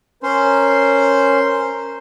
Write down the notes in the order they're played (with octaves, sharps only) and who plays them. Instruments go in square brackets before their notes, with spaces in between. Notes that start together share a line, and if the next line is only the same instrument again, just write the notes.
[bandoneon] C#4 [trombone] A#4 [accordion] C5 C6